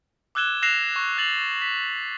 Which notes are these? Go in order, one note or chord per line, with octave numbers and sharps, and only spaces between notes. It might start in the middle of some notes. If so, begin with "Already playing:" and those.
D6 E6 F#6 G#6 E7 G7
E6 F#6 A#6 C7 E7 F7
C#6
F#6 A6 F7 F#7
B6